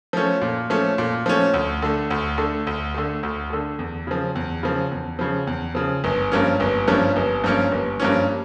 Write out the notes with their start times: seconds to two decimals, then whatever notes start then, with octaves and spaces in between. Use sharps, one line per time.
0.13 F3 A3 C#4
0.41 A#2
0.70 F3 A3 C#4
0.98 A#2
1.26 F3 A3 C#4
1.54 D2
1.82 D3 A3
2.10 D2
2.38 D3 A3
2.67 D2
2.94 D3 A3
3.23 D2
3.50 D3 A3
3.79 E2
4.07 C#3 F3
4.35 E2
4.63 C#3 F3
4.92 E2
5.19 C#3 F3
5.47 E2
5.75 C#3 F3
6.04 G1
6.32 G2 F3 A#3 C#4
6.60 G1
6.87 G2 F3 A#3 C#4
7.16 G1
7.44 G2 F3 A#3 C#4
7.72 G1
8.00 G2 F3 A#3 C#4